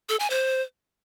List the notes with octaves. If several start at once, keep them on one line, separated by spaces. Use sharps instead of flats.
A4
G#5
C5